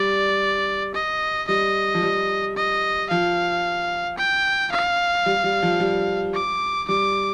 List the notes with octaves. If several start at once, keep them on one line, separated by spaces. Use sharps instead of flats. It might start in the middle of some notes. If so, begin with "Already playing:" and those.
Already playing: G3 D5
D#5
G3 D#5
F3
G3
D#5
F3 F5
G5
F5
G3
G3
F3
G3
D6
G3 D6